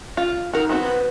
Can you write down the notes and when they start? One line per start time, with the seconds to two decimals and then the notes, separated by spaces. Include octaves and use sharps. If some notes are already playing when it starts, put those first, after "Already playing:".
0.17 F4
0.53 D#4 F#4 A#4
0.69 B3 C4 F#4
0.82 B4